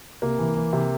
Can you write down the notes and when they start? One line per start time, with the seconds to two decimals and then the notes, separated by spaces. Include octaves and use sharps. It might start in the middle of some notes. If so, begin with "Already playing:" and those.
0.22 C3 A#3
0.39 E3
0.57 E3
0.73 C3